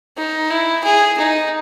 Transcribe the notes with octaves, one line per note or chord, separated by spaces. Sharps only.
D#4
E4
G#4
D#4